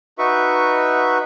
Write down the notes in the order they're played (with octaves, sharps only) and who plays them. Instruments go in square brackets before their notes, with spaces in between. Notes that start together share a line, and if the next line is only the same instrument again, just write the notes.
[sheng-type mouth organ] D#4 F#4 B4 E5 C#6